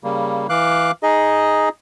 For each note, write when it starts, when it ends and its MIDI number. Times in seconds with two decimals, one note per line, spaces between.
0.04 0.47 49
0.04 0.47 55
0.04 0.47 58
0.50 0.91 52
0.50 0.91 77
0.50 0.91 86
0.50 0.91 90
1.03 1.69 63
1.03 1.69 68
1.03 1.69 75